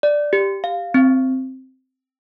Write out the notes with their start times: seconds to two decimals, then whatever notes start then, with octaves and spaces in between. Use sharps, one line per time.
0.03 D5
0.33 G4
0.64 F5
0.94 C4